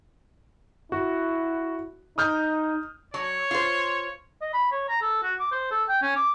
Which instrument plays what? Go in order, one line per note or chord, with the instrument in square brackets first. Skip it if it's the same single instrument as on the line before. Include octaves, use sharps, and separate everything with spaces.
[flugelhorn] E4 [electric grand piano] F#4
[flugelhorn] D#4 [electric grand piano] D#6 F6 G6
[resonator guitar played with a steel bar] F#3 [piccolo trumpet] C#5
[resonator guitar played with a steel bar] F4 C5
[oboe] D#5
B5
C#5
A#5
A4
F#4
D6
C5
A4
G5
C#4
D6